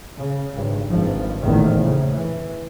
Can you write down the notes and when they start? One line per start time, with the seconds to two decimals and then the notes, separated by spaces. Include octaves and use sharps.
0.18 C#3
0.53 G#1 G2
0.89 G#1 G2 F3
1.41 F1 A#1 E2 A2 D#3
1.80 C#3
2.13 E3